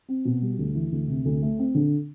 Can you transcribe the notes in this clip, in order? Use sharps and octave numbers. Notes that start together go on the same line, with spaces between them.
C4
B2
G3
D2
E3
D2
C3
D2
A3
C4
D3